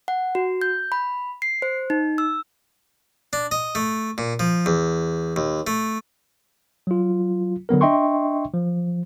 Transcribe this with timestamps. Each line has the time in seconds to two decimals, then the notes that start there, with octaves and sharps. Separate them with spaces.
0.08 F#5
0.35 F#4
0.62 G6
0.92 B5
1.42 C7
1.62 C5
1.90 D#4
2.18 E6
3.33 D4
3.51 D#5
3.75 A3
4.18 A#2
4.40 F3
4.66 E2
5.36 D#2
5.67 A3
6.87 F#3 F4
7.69 D3 F#3 B3 A#4
7.81 D4 D#5 E5 G5 C6 C#6
8.54 F3